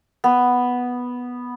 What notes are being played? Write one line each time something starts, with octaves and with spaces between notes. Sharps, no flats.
B3